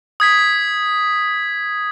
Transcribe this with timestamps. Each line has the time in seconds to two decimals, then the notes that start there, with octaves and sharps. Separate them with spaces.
0.20 D#6 G#6 B6